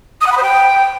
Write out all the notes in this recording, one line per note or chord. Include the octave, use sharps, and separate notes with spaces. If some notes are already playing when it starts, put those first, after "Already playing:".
D#6
F#5
B5
C5
G5